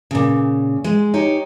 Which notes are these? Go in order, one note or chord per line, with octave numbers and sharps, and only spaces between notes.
A#2 C#3
G#3
D#4 G4 C#5